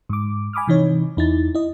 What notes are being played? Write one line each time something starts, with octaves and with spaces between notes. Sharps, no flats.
G#2 D6
G#5 B5 D6 D#6 F6
C3 E3 D#4 C#5
E2 D#4 E4 A6
E4 D#5